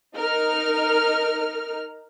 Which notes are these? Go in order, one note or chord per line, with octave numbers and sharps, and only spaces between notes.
D#4 A#4 F6